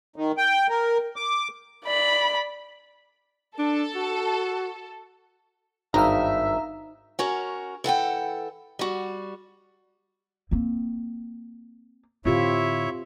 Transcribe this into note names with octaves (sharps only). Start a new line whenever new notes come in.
D#3
G5
A#4
D6
D5 B5
D4 A4
F#4
G#1 G2 D#4 E5 F5 A#5
C#4 F#4 A#4
E3 A4 F#5 G5
G3 F#4
A#3 C4
A2 D3 C4 E4 F4 G4 C#5 E5